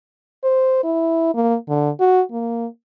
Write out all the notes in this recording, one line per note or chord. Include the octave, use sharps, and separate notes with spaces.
C5
E4
A#3
D3
F#4
A#3